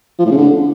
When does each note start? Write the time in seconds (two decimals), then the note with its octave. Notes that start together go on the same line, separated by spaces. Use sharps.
0.19 F3
0.25 A2
0.31 C#3
0.37 D3